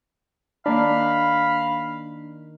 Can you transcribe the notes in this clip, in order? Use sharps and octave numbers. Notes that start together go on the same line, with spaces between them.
D#3 A#3 D4 F5 B5